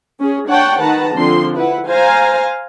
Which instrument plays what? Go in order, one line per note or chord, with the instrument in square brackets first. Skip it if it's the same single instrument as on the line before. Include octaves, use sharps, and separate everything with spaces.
[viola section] C#4 G#4
D4 C#5 F#5 G5 A5
D#3 B4 F#5 A5 A#5
D3 F3 C4 C6
E4 B4 F#5
C5 F5 G#5 A#5